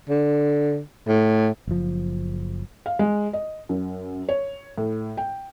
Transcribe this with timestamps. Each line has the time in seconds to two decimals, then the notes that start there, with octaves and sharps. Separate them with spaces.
0.09 D3
1.08 A2
1.67 F#1 F3
2.86 F5
2.99 G#3
3.33 D#5
3.69 F#2
4.29 C#5
4.78 A2
5.17 G5